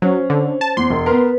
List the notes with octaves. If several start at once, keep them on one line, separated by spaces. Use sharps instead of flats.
F#3 C#4 C5
D3
A5
E2 C6
E1
B3 A#4 B4